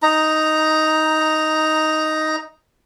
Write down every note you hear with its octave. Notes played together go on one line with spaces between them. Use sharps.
D#4 A#5